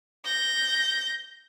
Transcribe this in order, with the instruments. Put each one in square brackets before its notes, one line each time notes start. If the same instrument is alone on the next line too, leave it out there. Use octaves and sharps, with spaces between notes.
[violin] G6 A#6